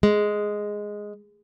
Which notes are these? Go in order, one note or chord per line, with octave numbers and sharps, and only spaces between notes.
G#3